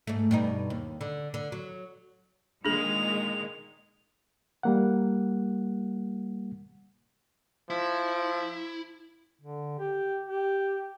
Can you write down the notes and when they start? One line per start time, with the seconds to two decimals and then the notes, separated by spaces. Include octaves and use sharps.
0.07 G#2 A3
0.31 G2 B2 D#4
0.70 D#2
1.01 D3
1.34 D3
1.52 F#3
2.65 A#2 D#3 G#3 D4 G#4 F7
4.63 G3 A#3 F#5
7.70 F3 E4
9.41 D3
9.79 G4
10.26 G4